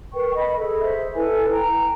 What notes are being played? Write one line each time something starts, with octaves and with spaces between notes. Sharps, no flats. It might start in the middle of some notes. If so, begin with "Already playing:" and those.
A#4 B4 G5 C#6
D#5 B5
G#4 A4
C5 E5
E4 A4 B4 G#5
G5 A#5